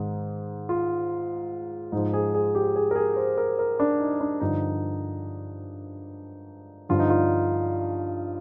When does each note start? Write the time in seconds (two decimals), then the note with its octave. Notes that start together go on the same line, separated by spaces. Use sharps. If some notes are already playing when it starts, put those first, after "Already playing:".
Already playing: G#2 D#3 D#4
0.69 F4
1.92 G#2 F3 D#4
2.14 G#4
2.34 G#4
2.55 G4
2.76 G#4
2.91 A#4
2.96 G#4
3.16 C5
3.38 A#4
3.59 A#4
3.80 D4
4.00 D#4
4.21 D4
4.40 G2 D3 F3 D#4
6.89 G2 D3 F3 F4
6.99 D#4
7.10 F4